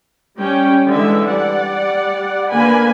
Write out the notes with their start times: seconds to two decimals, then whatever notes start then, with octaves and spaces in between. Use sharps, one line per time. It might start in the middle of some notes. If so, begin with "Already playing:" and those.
0.37 G3 C#4 G5
0.90 D3 E3 G#3 A4 E5
1.29 G3 D5 F#5
2.52 D3 A#3 B4 G#5 B5